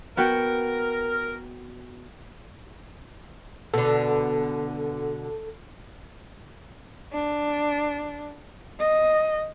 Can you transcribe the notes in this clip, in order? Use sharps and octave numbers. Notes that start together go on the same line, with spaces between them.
B3 F#4 A#4 G5
B2 D3 A4
D4
D#5